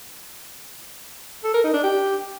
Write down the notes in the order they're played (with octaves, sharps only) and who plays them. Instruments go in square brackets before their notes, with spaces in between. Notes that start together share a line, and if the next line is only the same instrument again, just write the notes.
[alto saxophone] A4
A#4
D#4
D4
G4